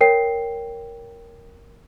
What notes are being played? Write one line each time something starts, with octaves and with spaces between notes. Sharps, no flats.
A#4 C#5 G5 C7